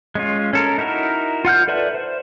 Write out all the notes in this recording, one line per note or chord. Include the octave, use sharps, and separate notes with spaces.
G#3 C#4 F4
C#4 A4 A#4
D#4 E4 F#4 A#4
F4 F#5 F6 G6
A4 B4 D5 E5 A5
C5